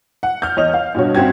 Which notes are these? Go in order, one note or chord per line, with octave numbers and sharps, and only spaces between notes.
F#5
F6 G6
E2 C#5 D#5 F7
F5
G2 B2 F#4 C#5
G1 C4 C#4 F#4 G5 G#6